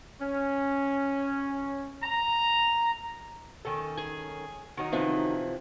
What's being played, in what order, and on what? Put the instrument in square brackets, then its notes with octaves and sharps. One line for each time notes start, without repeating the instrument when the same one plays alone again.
[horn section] C#4
A#5
[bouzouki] D#3 C#4 A4
[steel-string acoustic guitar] G#4 G#5
[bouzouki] D#3 F#3 D#4
[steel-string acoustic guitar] C3 E3 F3